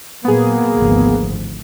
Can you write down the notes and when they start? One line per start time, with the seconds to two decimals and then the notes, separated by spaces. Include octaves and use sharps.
0.25 A#2 F#3 A#3 B3 G#4
0.75 G#1 D2 F3